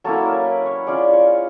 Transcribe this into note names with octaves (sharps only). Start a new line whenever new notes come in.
F#3 A#3 C#4 E4 A4
A#4
B4
C#5
G#3 C#4 F4 D5
C#5